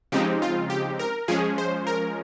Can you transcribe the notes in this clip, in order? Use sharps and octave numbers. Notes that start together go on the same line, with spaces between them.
C#3 F3 G#3 C4 D#4 G4
F4
G4
A#4
F3 G#3 C#4 G#4
C5
A#4